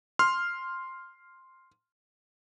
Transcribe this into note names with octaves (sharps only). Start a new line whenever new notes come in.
C6 F6